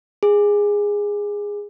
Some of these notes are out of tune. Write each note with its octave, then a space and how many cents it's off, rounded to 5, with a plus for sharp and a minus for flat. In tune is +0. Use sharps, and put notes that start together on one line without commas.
G#4 -15